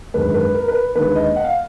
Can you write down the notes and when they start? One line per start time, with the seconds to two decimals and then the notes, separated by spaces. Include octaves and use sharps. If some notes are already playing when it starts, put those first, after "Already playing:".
0.14 G#1 F#2 D3 G#3 B4
0.34 B4
0.54 A#4
0.68 B4
0.95 D#2 D3 G#3 B4
1.16 D#5
1.36 F#5
1.45 F5